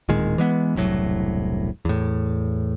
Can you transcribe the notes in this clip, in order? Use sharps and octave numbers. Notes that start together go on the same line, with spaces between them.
D1 A#2 D#3 G#3
E3 G#3 B3
E1 C2 A2 F#3
E2 A2